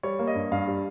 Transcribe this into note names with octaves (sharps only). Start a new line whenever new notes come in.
G3 C#5
A#3
D#5
G2
G2 F5
G3